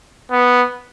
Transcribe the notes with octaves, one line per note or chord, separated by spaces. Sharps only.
B3